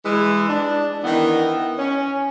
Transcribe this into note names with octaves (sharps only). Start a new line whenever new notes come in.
E3 G#3
D4
D#3 E3 B3
C#4